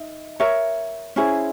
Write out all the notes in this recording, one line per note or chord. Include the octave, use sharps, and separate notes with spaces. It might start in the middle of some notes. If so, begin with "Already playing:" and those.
Already playing: D#4 E5
A#4 C#5 E5
C#4 E4 G#4 C5